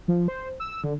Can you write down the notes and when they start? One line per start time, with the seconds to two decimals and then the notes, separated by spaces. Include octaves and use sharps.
0.08 F3
0.28 C5
0.60 E6
0.84 D3